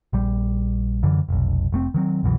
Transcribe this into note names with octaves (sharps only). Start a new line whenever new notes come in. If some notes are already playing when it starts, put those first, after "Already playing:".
A#1 G3
F#2 D3 E3
F1 B1
F1 A3 C4
D#3 F#3 C4
C2 F#2 B2 E3